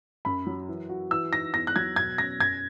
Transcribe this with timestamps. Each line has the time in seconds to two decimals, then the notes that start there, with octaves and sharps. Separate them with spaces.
0.25 F#2 B5
0.47 F#3
0.68 E3
0.89 F#4
1.11 E3 E6
1.33 D#4 A#6
1.54 E2 A#6
1.67 F#6
1.76 F#3 G#6
1.96 B2 G#6
2.18 C#4 A#6
2.40 F#2 G#6